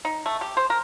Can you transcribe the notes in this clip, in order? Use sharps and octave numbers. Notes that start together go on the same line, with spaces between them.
D#4
A3
G4
C5
A#4